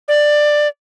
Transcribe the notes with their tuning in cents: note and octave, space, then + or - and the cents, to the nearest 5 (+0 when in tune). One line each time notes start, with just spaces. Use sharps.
D5 +10